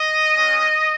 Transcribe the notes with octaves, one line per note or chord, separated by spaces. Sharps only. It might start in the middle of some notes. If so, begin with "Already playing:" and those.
Already playing: D#5
G#3 C#4 F#4